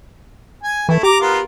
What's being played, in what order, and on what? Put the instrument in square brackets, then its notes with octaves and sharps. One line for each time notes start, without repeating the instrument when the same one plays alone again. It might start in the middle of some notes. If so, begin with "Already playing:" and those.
[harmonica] G#5
[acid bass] E3 [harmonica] A3 E4
[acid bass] G4 [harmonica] A#5 D6
[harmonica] B3 F4 A#4